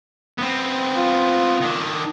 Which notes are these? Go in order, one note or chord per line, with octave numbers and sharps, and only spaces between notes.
B3 C4
F4
D#3 D4